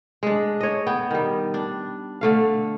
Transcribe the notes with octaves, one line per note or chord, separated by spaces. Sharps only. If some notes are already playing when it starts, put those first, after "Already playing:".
G#3 D4
C#5 D#5
B3 G5
D#3 G3
D4
D3 A3 F5